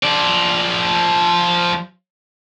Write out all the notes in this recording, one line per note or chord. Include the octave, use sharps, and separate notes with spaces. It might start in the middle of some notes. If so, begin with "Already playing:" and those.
F3 D5